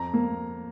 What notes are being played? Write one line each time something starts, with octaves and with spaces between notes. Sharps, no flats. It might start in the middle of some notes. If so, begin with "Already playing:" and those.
Already playing: F2 A#5
A#3